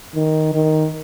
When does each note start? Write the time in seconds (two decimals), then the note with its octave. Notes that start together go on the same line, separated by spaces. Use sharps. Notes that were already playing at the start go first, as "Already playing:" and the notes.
0.14 D#3
0.53 D#3